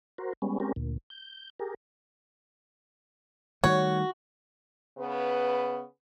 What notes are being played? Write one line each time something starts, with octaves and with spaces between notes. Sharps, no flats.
F#4 A#4 C5
G3 G#3 B3 C#4
G#3 C4 C#4 G4 A#4
D2 A#2
G6
G4 G#4 A#4
D#3 G3 A3 F#4 C#5
C#3 B3 B4